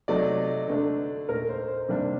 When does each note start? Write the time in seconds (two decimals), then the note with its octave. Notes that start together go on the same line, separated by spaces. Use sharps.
0.08 C3 F#3 A3 D#4 D5
0.68 D3 A3 D4
1.29 A#2 A3 D#4 A#4
1.49 C5
1.68 C5
1.88 C3 D#3 G3 A#3 D4